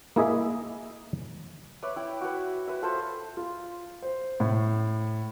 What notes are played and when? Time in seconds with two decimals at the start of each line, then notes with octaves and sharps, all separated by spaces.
0.16 A#3 E4 G#4 D#5 E5
1.83 B4 C#5 D5 E5
1.96 E4 G5
2.21 F#4 B4
2.67 B4 E5
2.82 F4 A4 B4 C5
3.37 F4
4.02 C5
4.40 A2